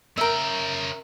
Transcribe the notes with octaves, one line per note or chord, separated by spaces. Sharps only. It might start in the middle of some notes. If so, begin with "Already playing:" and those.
C#3 A#4 E5 G5